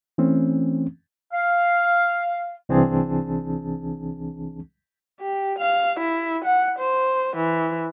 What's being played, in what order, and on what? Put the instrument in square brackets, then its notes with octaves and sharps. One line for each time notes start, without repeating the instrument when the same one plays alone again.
[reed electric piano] E3 A3 C4 C#4
[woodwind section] F5
[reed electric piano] C2 E3 C4 D4 G#4 A5
[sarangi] G4
F5
E4
F#5
C5
E3